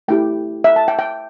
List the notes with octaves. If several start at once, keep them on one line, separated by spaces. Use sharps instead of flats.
A3 E4 G4 G5
E5
A5
G5
G5